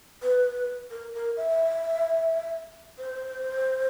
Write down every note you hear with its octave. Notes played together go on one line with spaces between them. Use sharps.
B4
A#4
A#4
E5
C5